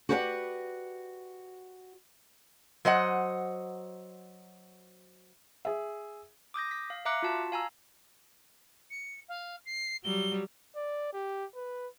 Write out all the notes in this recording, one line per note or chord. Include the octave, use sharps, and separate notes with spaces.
F#4 G4 B4 D5 F5 F#5
F#3 C5 D#5 F#5
G#4 E5
D6 D#6 G6 A#6
B6
F5
E5 F5 A#5 D6 F#6 C#7
F4 F#4 A5
F5 G#5 A#5 E6
C#7
F5
C7
F#3 G3 G7
D5
G4
B4